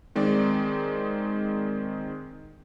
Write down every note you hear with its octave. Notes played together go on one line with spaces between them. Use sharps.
D#3 G#3 C4 D#4 D5